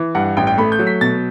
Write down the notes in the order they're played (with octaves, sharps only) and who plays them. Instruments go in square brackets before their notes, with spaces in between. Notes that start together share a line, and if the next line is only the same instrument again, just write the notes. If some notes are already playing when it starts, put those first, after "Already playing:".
Already playing: [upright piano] E3
G2 F#5
F#5
A1 G5
G5
A3 B5
G6
F#3
B6
B2 A6